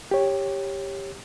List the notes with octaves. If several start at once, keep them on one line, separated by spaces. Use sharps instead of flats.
G4 C#5